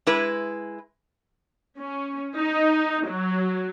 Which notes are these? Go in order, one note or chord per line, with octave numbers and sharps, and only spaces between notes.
G#3 E4 B4
C#4
D#4
F#3